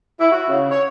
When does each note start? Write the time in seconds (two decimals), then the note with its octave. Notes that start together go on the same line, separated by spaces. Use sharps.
0.20 E4
0.32 F#4
0.48 C#3
0.71 C#5